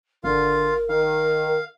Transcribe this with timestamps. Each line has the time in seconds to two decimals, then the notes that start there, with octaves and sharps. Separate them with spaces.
0.24 G#1 D3 F4 A#4 F5
0.89 D#3 F5